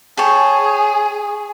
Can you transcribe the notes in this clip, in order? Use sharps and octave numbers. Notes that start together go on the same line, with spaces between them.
G#4 C#5 G5 A5